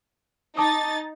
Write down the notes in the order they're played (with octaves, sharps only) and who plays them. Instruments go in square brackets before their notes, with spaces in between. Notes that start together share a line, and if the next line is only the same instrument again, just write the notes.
[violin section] D#4 A6 [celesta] A5 D6 D#6